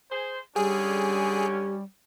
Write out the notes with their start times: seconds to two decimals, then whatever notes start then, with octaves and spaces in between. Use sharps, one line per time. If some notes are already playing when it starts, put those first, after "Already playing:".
0.11 G#4 C5
0.56 F#2 D3 G3 C#4 G4 G#4